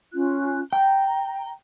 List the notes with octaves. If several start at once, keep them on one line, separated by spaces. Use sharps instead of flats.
C#4 F4 F#6
G5 A#5